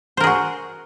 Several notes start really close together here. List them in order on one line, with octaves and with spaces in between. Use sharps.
C5 A#4 G#4 F#4